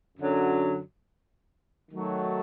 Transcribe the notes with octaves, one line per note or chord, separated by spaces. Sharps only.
F#2 D3 F#3
D#3 F#3 A3